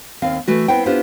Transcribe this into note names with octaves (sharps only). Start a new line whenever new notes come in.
D#2 C4 F5
E3 A3 F#4
B3 C4 E4 C5 F#5 G5
B3 D4 E4 F4 G4 C5